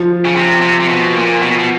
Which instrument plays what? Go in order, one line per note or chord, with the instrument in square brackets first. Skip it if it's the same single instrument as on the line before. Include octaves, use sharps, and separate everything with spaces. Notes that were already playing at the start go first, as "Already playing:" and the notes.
Already playing: [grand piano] F3
[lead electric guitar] C#3
C3
C3
C3
B2
A#2
B2
B2